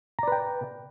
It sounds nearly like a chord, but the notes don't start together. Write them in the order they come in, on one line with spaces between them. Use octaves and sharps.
A#5 D5 B4 G5